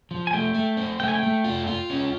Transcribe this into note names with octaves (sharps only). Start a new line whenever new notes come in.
F3
G#5
A3 G5
A3
C4
A3 G5
G#5
G5
A3
F4
F4
C#4